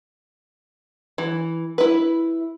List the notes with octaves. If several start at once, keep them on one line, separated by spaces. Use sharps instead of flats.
E3
E4 B4